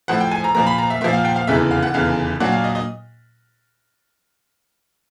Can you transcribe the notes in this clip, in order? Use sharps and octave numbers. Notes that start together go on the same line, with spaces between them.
A2 F3 A3 F#5
G5
G#5
A#5
A#2 F3 A#3 A#5
B5
A#5
E5
A#2 F3 A#3 E5
F5
G5
F5
F1 E2 C#3 E3 E5
F5
F#5
F1 E2 C#3 E3 F5
A#2 F#3 A#3 D4 F#5
F5
D#5
D#5